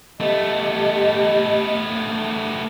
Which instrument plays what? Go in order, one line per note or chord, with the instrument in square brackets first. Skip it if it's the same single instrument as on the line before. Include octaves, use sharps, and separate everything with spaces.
[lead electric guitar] A3 B3 [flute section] G4 D#5